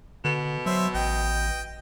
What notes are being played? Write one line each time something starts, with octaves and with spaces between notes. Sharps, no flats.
B2 D3
F#3 C5 E5
A1 D#5 G5